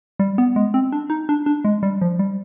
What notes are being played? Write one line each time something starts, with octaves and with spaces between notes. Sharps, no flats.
G3
B3
G#3
C4
D4
D#4
D4
D4
G#3
G3
F3
G3